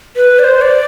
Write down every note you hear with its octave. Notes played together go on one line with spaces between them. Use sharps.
B4
D5
C5
D5